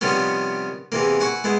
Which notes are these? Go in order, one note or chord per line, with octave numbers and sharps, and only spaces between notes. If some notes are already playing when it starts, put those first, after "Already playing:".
C3 D#3 F3 G3 B3 C#4
E2 C3 E3 A#3
E4 F#5 G#5 C#6
G#3 B3 E4